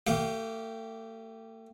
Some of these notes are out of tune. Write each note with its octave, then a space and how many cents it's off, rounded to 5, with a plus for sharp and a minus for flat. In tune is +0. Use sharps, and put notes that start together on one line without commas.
A3 +35 G4 -10 F5 +25